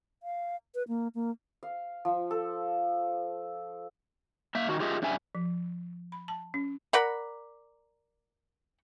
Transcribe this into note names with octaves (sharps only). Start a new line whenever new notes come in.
F5
B4
A#3
A#3
F5
F3
A4
A#3 E5
D#3 F#4
F4 G4 G#4 D#5 E5
G2 C#3 G3 E5 G#5
F3
B5
A5
C#4
A#4 D5 F#5 B5